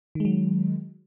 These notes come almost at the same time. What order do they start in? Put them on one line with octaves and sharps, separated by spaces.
D#3 G#3 F#3